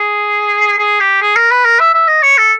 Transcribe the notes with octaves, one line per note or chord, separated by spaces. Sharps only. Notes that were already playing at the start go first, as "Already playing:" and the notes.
Already playing: G#4
G#4
G4
G#4
A#4
B4
A#4
E5
E5
D#5
C#5
A4